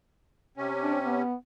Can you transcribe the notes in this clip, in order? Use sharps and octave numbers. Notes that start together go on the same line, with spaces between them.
C3 C#4
D4
B3